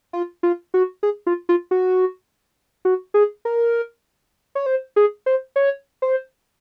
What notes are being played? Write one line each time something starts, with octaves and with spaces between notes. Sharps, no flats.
F4
F4
F#4
G#4
F4
F4
F#4
F#4
G#4
A#4
C#5
C5
G#4
C5
C#5
C5